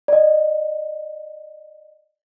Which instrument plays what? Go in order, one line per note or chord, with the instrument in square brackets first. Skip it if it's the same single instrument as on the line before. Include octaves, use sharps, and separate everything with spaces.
[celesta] D5 D#5